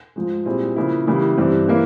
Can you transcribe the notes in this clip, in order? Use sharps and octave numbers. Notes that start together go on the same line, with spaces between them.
G#2 F3 G#3
A#2 G3 C4 E4 G#4
C#3 F3 A#3 E4 G#4
C#3 E3 G3 A#3 E4
G2 E3 G3 C4
E3 A#3 E4